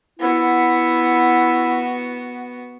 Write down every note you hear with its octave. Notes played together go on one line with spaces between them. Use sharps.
B3 E4 F#4